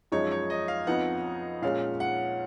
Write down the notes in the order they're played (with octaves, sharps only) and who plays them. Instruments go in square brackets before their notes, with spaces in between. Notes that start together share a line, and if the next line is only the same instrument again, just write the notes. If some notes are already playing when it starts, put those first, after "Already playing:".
[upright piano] F#2 F3 G#3 D#4 [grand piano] C#5
[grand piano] C#5
D#5
F5
[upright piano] F2 F3 B3 D#4 [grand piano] F#5
[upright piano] A#2 G#3 C#4 [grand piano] F5
[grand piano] F#5